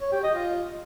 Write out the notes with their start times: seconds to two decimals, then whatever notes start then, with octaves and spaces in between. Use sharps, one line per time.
0.01 C#5
0.12 G4
0.23 D#5
0.35 F4